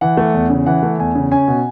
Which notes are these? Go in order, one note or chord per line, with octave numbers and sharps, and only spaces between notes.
E3 F#5
A3
E2
C#3
E3 F#5
A3
E2 G#5
C#3
C#4 G#5
B2